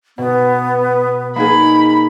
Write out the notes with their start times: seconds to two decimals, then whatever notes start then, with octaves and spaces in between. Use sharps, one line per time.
0.18 B2 B3
1.36 A#3 D#4 G#4 B5